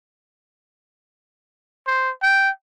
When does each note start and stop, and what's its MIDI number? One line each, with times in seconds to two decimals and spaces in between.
1.87 2.11 72
2.23 2.50 79